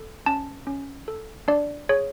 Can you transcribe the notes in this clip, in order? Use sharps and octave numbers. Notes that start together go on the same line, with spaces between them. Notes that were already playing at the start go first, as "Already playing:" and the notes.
Already playing: A4
C#4 A5
C#4
A4
D4 D5
G#4 C#5